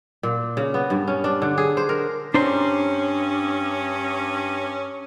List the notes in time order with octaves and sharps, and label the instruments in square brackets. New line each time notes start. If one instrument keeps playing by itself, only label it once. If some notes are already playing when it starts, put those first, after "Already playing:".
[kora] A#2
C#3
B3
G2
C#4
D4
D3
G#4
C5
A#4
[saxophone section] G2 C#4 [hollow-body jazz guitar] D4 C5 A#5